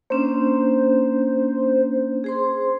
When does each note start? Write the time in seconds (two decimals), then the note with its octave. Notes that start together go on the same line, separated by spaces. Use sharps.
0.10 A#3 C#4 D4 C5
2.24 G#4 C5 C6